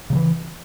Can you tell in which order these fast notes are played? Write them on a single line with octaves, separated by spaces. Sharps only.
C#3 F#3 E3